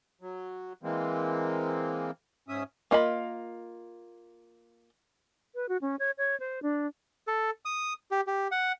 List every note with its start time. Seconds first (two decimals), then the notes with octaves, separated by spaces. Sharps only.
0.21 F#3
0.83 E3 G#3 A#3 C4
2.48 G#2 C#4 E5 D#6
2.91 A#3 F4 D#5 B5
5.55 B4
5.69 F#4
5.81 C#4
5.99 C#5
6.18 C#5
6.40 C5
6.63 D4
7.27 A4
7.65 D#6
8.11 G4
8.27 G4
8.52 F#5